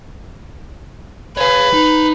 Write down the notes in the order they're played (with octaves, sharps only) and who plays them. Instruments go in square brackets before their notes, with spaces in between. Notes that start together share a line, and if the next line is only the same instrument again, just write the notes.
[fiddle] B4 [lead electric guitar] C#5 F5
[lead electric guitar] D#4